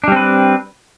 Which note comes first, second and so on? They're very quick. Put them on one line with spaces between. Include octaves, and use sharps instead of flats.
D4 G3 C4 B4